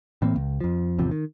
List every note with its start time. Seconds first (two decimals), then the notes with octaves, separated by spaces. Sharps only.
0.22 A2 E3 A#3 C4
0.36 C#2
0.61 F2 F3
0.98 G#1 E2 C3 F3
1.11 D#3